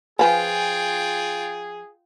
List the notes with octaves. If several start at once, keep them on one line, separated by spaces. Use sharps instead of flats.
F3 F4 G#4 B4 G5 G#5